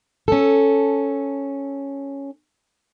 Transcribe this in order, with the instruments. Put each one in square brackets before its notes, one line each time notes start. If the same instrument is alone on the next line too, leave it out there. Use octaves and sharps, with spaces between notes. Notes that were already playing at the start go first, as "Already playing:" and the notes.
[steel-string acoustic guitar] C#4 A4